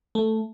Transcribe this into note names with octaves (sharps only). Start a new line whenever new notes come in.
A3